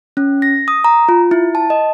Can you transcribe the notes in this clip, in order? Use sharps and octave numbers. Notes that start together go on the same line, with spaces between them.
C#4
A#6
D#6
A#5
F4
E4
A5
D#5